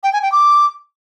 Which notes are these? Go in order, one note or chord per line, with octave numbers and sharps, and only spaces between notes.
G5
G#5
G5
D6